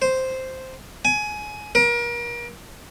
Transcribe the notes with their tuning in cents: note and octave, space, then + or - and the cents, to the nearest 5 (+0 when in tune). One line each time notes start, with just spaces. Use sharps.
C5 -5
G#5 +20
A#4 +35